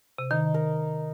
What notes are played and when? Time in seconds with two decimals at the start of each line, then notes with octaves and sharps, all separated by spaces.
0.18 C3
0.30 D#3 D#4
0.54 A#4